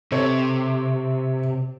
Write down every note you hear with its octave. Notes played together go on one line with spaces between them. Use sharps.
C3 A4 C#5